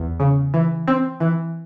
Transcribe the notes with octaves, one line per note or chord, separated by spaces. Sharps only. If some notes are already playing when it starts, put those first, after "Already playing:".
Already playing: E2
C#3
E3
C4
E3